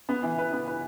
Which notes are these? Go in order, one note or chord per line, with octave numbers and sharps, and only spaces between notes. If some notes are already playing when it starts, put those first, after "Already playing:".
B3
E3
B4
B3
B4